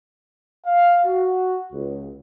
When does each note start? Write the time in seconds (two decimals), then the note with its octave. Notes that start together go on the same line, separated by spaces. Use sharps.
0.66 F5
1.06 F#4
1.73 C#2